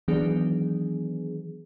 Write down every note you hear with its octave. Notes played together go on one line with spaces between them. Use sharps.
D#3 E3 F#3 B3 D4 G#4